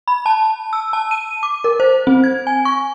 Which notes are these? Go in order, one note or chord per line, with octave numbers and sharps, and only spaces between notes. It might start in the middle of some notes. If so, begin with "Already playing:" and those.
B5
A5
E6
A5
D#7
D6
A#4
C5
C4
G#6
G#5
C#6